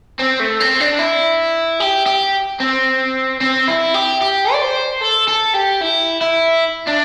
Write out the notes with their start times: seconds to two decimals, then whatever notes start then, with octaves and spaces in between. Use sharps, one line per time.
0.19 C4
0.40 A3
0.60 C4
0.80 D4
0.99 E4
1.80 G4
2.06 G4
2.60 C4
3.41 C4
3.68 E4
3.94 G4
4.21 G4
4.52 D5
4.62 C5
5.02 A4
5.28 A4
5.55 G4
5.81 E4
6.21 E4
6.88 D4